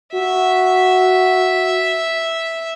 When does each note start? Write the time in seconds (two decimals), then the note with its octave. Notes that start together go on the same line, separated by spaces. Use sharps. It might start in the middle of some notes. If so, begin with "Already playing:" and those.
0.14 F#4 E5